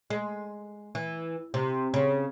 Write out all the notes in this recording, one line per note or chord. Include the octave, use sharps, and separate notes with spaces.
G#3
E3
C3
C#3